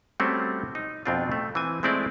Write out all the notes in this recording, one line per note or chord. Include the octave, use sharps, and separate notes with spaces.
G3 A3 C4 C#4 F#4
D#4
F2 B2 C4 D4 F4
A3
E3 C4 G#5
G#3 A3 C4 E4 D5